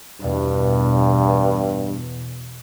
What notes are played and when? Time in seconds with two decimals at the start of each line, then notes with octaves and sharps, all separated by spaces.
0.20 E2 G2 B2